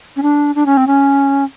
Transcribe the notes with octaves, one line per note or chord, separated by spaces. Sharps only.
C#4
D4
D4
C#4
C4
C#4